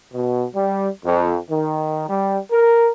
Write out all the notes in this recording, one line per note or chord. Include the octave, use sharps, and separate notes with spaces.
B2
G3
F2
D#3
G3
A#4